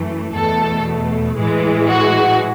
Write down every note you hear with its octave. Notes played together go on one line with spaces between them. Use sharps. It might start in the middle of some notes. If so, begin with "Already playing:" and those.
Already playing: F#2 E3 A3
E2 B2 A3 A4
A2 E3 G#3
F#4